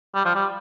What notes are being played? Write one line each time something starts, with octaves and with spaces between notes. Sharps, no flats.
G3
F3
G3